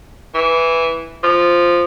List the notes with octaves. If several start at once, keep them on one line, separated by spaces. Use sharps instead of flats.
E3
F3